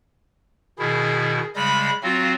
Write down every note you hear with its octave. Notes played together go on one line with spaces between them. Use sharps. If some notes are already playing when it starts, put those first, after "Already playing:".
B2 D#3 E4 G#4
C#3 G3 G#3 B5
F#3 C4 F4 F#4